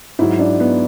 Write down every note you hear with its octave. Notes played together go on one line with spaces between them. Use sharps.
G#2 F#3 E4
D4
B3